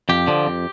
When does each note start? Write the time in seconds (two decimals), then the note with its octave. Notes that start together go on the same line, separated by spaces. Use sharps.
0.09 F2 G4
0.27 D3 F3
0.47 F2